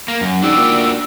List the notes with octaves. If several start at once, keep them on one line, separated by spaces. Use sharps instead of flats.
A#3
F#2
G#2 D4 F#4 D5 G5 E6
A#2